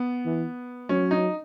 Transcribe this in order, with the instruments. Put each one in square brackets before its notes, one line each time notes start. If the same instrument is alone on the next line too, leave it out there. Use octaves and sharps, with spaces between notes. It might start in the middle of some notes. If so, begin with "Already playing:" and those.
Already playing: [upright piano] B3
[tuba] E3
[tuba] F#3 [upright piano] C#4
[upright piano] D#4